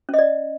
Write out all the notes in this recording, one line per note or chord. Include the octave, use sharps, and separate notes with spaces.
C#4 D5 D#5